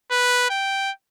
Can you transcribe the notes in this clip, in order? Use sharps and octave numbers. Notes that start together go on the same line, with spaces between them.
B4
G5